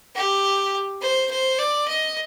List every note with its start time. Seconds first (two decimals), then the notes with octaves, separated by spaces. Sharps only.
0.15 G4
1.01 C5
1.31 C5
1.59 D5
1.88 D#5